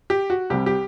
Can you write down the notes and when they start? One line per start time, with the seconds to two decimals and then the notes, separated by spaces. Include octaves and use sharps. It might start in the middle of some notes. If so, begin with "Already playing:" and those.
0.10 G4
0.30 F#4
0.50 C2 C3 G3 G4
0.66 G4